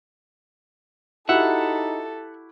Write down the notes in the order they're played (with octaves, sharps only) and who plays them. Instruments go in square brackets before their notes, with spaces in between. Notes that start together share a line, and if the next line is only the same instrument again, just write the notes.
[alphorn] D#4 [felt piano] E4 F#4 G4 [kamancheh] A4 [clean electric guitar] E5 F#5